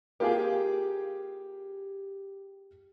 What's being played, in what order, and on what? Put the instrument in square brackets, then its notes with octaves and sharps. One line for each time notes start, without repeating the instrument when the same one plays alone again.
[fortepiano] A#3 F4 G#4 [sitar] G4